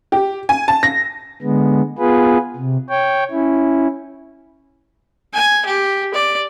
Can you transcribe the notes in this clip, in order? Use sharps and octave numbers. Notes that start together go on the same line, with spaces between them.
G4
G#5
A5
A#6
D3 G#3 B3
B3 F4 G#4 B4
C3
C#5 G5
C#4 E4
G#5
G4
D5